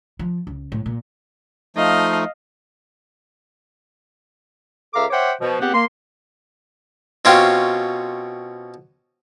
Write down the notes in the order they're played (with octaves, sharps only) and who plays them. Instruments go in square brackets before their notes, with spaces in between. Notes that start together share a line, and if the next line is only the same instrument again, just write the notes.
[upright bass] F3
C#2
A2
A#2
[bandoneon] F3 A3 D#4 [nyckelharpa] D#5 F5
[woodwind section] C#2 A4 E5 F5 A#5 D6
C5 C#5 E5 F#5 G5 D6
B2 F3
C#2 B3 C4 G4 F#5
A#3 C6
[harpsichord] B2 C4 C#4 F4 G4